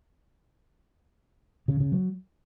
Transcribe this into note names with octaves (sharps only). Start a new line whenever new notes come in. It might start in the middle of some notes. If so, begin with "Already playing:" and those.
C#3
C#3
F#3